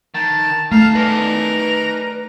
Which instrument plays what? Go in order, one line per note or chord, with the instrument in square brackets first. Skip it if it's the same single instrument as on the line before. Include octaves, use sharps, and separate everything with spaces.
[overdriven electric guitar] D#3 [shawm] A5
[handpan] A3 [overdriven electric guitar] D#4 A5 [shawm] F5
[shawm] A#4 [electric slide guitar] B4 D5 G#5